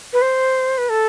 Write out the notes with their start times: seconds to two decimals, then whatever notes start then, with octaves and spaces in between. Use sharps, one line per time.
0.13 B4
0.22 C5
0.78 B4
0.89 A4